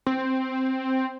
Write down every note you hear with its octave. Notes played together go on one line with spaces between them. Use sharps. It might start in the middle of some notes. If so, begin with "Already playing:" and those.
C4